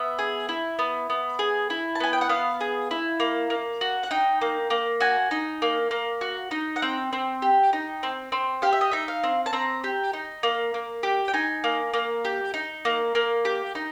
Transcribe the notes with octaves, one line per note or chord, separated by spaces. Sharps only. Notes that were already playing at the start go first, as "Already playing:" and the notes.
Already playing: B3 E5
G#4
E4
B3
B3
G#4
E4
A5
B3 G#5
G5
F#5
B3 F5
G#4
E4
A#3
A#3
F#4
F#5
D#4 G5
A#3
A#3
F#4 G#5
D#4
A#3
A#3
F#4
D#4
F#5
C4 G5
C4
G4
D#4
C4
C4
G4 F5
E5
D#5
D#4 E5
F5
C4
A5
C4 A#5
G4
D#4
A#3
A#3
G4
G5
D#4 G#5
A#3
A#3
G4
D#4
A#3
A#3
G4
D#4